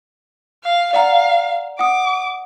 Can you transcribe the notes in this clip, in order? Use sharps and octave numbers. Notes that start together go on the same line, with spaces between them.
F5
D5 F5 F#5 A#5
F#5 D6 D#6